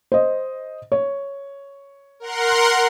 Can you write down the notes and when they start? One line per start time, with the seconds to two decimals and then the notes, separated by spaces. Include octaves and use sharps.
0.12 C5 D#5
0.92 C#5
2.20 A#4 F#5 C6